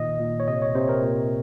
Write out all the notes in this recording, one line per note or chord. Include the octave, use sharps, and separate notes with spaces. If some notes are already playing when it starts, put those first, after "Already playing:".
Already playing: A#2 D#3 D#5
A#2
C#5
C3 D#5
C#5
C3 C5
A#4
A#2